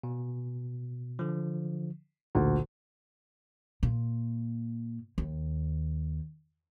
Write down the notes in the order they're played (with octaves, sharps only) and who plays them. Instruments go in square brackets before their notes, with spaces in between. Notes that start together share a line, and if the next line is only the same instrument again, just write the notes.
[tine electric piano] B2
D3 F3
[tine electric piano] A1 A#2 [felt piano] D2
[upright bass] A#2
D#2